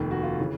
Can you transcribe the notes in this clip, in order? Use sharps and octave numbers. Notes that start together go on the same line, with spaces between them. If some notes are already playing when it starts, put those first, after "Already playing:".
Already playing: F1 D#2 D#3
F#4
F4
C#3 E3